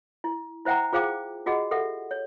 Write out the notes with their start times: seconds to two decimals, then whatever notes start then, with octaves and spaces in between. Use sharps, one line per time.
0.24 E4
0.65 E4 C5 E5 F#5 G5 A#5
0.93 F4 G#4 C5 F5 G5 D6
1.46 F4 F#4 G#4 D#5 F#5
1.71 G4 A4 E5 F#5
2.11 C#5